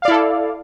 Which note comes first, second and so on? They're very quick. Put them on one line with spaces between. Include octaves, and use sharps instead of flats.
F5 D5 E4 A4